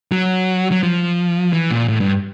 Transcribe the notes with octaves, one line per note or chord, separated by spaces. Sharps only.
F#3
F#3
F3
E3
A#2
A2
G2